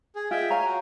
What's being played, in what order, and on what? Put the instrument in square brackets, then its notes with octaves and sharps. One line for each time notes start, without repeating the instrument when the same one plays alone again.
[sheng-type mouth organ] G#4
[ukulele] F4 D#5 [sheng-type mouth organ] G#4 E5 G5
[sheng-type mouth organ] C#5 G#5 [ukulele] F5 A#5
[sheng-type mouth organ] F#4